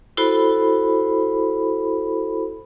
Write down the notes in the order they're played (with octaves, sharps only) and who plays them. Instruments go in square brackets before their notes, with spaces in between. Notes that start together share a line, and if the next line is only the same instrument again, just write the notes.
[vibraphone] E4 F#4 A4 C5 B5